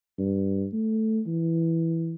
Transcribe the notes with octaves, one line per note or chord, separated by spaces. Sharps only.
G2
A3
E3